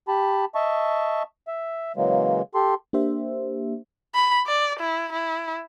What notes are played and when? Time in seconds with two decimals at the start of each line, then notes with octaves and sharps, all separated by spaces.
0.08 G4 A5 B5
0.55 D#5 E5 A5 C#6
1.48 E5
1.96 C#3 E3 F#3 G#3 A#3
2.55 G4 A4 C6
2.93 A#3 D4 G4 C5 E5
4.15 B5
4.47 D5
4.80 E4
5.13 E4